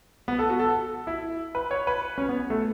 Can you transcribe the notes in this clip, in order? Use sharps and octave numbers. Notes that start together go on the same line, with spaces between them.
B3
A4
F#4
A4
E4
B4
C#5
B4
C#4
B3
A3